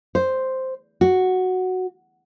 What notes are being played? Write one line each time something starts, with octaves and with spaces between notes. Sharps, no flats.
C5
F#4